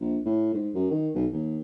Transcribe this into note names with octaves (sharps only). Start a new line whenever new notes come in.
A#1
A2
G#2
F#2
D#3
B1
D#2